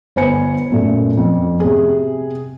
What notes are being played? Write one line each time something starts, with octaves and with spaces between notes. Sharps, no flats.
G1 B3 C5 G#5 B5 C#7
F#2 A#2 A3
F2
C3 G#4